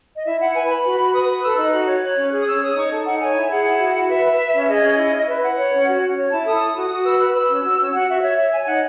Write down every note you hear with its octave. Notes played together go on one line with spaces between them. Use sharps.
D#5
E4 E5
E4 F#5
B4 G#5
B4 B5
F#4
F#4
B4 D#6
B4
A4 E6
D#4 F#6
F#4 F#6
C#5
C#5
C#4
G#4 F#6
D#6
C#4 E6
C#5 D#6
D#4 C#6
A4
D#4 F#5
C#5 G#5
E4
G#4 F#5
E4
F#4
F#4
B4 E5
B4
B4
C#4
G#4 D#5
C#4
E4
E4
B4 E5
B4 F#5
C#5
C#4
F#4
C#4
C#5
E4 A5
A4 D#6
E4
F#4
F#4
B4 E6
B4 F#6
B4 E6
C#4
F#4
C#4
F#4 F#5
F#4 E5
C#5 E5
C#5 E5
C#5 G#5
D#4 F#5